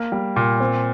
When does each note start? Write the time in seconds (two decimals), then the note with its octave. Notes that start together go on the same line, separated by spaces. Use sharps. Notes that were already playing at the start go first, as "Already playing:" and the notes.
Already playing: A#3
0.12 G3
0.36 A#2
0.60 C4